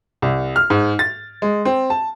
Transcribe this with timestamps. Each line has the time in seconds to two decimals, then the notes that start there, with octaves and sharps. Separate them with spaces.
0.22 C2
0.56 F6
0.70 G#2
0.99 A6
1.42 G#3
1.65 C4
1.90 A5